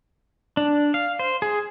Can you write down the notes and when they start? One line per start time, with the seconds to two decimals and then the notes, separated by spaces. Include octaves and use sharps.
0.57 D4
0.94 F5
1.19 C5
1.42 G#4